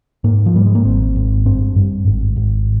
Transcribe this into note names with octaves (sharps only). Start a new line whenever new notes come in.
G#2 A#3
F3
G#2 G3
G#3
A#3
G#1 C4
G#1
G2 C4
G2
G#1
G#1